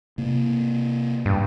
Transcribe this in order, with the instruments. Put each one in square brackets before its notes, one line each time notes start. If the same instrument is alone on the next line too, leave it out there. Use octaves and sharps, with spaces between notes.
[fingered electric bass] C3 A#3
[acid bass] G2